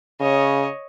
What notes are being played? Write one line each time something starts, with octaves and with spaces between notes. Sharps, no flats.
C#3 C#5 D#5